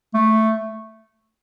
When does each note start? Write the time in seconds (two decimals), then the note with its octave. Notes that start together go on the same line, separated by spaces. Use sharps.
0.14 A3